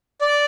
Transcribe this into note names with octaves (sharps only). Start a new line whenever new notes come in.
D5